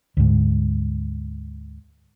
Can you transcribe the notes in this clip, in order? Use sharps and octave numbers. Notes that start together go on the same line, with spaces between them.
D2 G#2